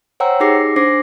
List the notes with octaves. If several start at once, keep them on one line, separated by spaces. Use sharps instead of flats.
C5 C#5 F#5 G5 A#5 E6
D#4 G4 G#4 D6 A#6 C7
D4 C5 D6 A#6 C7